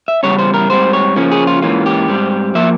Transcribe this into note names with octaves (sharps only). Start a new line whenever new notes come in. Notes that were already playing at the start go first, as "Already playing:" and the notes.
E5
E2 C#3 G3 C#4 C#5
C5
A#4
G#2 G3 C4 C5
C#5
C#3 F3 A#3 C#4
G#4
F4
G#2 E3 A#3 C#4 F4
G4
G#2 G3 C4
F3 A#3 E5